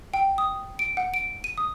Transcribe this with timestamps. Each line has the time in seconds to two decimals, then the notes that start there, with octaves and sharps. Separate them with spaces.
0.14 G5
0.38 D#6
0.79 D7
0.97 F#5
1.14 D7
1.44 D#7
1.58 D#6